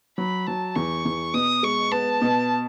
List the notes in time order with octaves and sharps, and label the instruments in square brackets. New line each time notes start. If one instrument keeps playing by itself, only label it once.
[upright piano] F#3 [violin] B5
[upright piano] F#3 [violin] A5
[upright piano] E2 [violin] C#6
[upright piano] E2
[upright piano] B2 [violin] D#6
[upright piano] G#3 [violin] C#6
[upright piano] B3 [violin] A5
[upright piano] B2